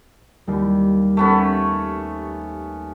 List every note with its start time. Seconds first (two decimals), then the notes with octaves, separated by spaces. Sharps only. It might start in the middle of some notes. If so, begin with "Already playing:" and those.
0.47 D#2 G3
1.17 A3 B3 C#4